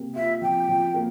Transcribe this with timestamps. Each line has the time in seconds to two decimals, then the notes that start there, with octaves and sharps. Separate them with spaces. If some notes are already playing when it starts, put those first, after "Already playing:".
Already playing: C3 A#3
0.15 F4 E5
0.41 F3 G5
0.69 F3
0.94 A#3